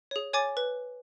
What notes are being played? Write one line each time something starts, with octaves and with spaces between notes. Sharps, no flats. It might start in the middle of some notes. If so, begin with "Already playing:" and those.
G#4 C#5
C#5 G#5 D6 A6
B4